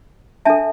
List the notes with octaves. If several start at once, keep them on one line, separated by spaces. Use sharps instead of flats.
D4 A4 E5 A5